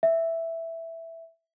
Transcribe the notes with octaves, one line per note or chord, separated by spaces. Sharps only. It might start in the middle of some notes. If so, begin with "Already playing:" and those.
E5